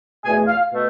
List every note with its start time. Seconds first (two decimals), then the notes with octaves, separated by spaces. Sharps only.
0.23 E2 B2 A3 G#5
0.47 F5
0.72 B2 A3